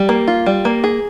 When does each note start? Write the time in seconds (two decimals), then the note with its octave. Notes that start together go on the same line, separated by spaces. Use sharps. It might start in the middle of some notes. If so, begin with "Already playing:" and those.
Already playing: G3
0.09 A#3
0.28 F4
0.46 G3
0.65 A#3
0.84 G#4